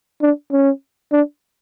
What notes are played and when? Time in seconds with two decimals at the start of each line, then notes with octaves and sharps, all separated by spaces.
0.22 D4
0.52 C#4
1.12 D4